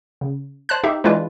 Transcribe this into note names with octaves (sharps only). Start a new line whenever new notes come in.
C#3
C5 A5 F#6
D#4 G4 E5
E3 G#3 D4 E4 F4 B4